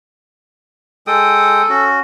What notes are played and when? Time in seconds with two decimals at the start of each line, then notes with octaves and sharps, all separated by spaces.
1.07 G#3 A4 G5 D#6
1.69 C#4 F#4